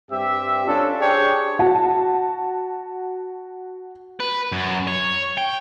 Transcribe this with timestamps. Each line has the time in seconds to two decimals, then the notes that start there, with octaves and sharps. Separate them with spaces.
0.11 G2 C4 G4 E5
0.67 C#4 D4 F4 A4
1.00 D4 G4 G#4 C5 C#5
1.59 F#4 A5
4.20 B4
4.52 F#2
4.87 C#5
5.37 G5